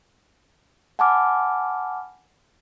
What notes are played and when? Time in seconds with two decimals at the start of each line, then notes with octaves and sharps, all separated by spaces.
0.99 F#5 G#5 A5 B5 D6 F6